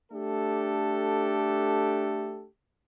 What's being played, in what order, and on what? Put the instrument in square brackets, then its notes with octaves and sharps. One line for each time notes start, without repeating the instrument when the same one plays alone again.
[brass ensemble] A3 D4 G4 A4